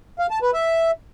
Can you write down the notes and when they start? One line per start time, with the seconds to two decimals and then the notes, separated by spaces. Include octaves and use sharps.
0.19 F5
0.31 A5
0.42 B4
0.54 E5